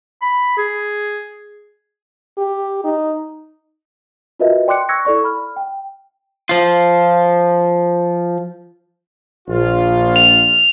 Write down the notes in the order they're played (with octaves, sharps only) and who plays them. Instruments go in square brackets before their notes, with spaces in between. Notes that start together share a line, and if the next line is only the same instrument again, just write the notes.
[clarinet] B5
G#4
[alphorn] G4
D#4
[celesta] F4 F#4 A#4 B4 D#5 E5
D5 G5 C6 D6 F#6 C#7
C#6 E6 F#6 G#6 A#6 C#7
E4 A4 D5 C#6
B5 F6
G5
[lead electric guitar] F3 F4
[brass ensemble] A#1 F4
[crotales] F7